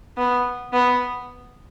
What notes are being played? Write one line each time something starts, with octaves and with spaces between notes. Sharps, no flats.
B3
B3